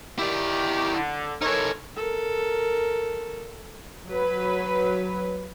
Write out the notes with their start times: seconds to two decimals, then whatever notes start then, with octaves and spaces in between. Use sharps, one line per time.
0.19 D#3 E4 G4 D5
0.93 D3
1.42 E3 D#4 A4 A#4 C#5
1.96 A4 A#4
4.09 F#3 B4